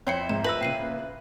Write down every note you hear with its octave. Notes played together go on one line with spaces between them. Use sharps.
F2 E4 C5 C#5 G5 C6 C#7
G#1 F2 G#2 E7
F3 B4 E6 A#6 F#7
A#2 C#3 G5 C7 D#7